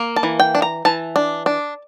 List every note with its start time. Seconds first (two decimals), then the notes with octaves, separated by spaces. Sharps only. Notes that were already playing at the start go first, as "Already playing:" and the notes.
Already playing: A#3
0.16 A5
0.23 E3
0.40 G5
0.55 D4
0.62 A#5
0.85 E3 A5
1.16 D4
1.46 D4